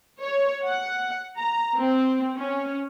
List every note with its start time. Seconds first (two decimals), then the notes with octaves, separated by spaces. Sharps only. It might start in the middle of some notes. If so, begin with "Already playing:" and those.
0.22 C#5
0.67 F#5
1.38 A#5
1.77 C4
2.36 C#4